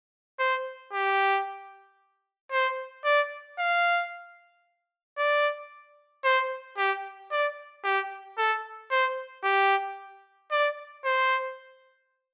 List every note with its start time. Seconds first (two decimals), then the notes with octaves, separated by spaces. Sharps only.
0.39 C5
0.93 G4
2.52 C5
3.05 D5
3.59 F5
5.18 D5
6.24 C5
6.77 G4
7.31 D5
7.84 G4
8.38 A4
8.91 C5
9.44 G4
10.51 D5
11.05 C5